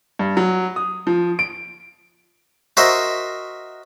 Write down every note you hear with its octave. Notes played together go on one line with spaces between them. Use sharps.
G2
F#3
D#6
F3
D7
F#4 A#4 C5 D#5 E5